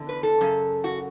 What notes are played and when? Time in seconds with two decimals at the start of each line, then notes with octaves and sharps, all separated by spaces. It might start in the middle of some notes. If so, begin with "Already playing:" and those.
Already playing: E2 D3
0.09 B4
0.23 A4
0.41 F#2 C#3
0.84 F#4